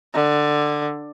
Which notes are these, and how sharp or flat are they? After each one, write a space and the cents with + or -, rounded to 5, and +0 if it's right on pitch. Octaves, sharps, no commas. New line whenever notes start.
D3 +15